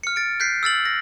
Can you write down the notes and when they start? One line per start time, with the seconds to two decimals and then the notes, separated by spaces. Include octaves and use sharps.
0.03 F6 C#7
0.16 A6 D7
0.40 F#6 G6 B6 C7
0.63 E6 F6 A6 F#7
0.85 A#6